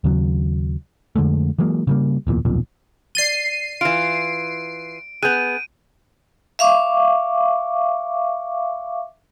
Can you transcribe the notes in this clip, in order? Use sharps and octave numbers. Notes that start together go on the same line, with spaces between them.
D#2 C#3 F#3
F2 D3 G#3 A3
E3 F#3 G#3 A#3
C#3 G3 A#3
D1 E2 A#2
D#1 B1 F2 A#2
D5 A6 C7 D#7 G7
E3 F4 D7
B3 G#4 F#6 G6 D#7
E5 F5 C#6 D6